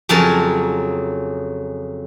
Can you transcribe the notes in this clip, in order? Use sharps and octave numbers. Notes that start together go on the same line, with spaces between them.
F2 C#3 F#3 A#4 G#5 A5